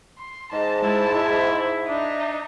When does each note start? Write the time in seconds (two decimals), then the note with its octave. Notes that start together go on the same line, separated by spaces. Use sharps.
0.18 C6
0.52 G#2 D#5 A5
0.84 G#3 E4
1.15 E4 E5
1.88 D4 D#4